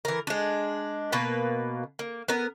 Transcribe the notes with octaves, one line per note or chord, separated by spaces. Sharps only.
E3 A#4
G#3 D4
B2 A#3 B4
A#3
B3 A#4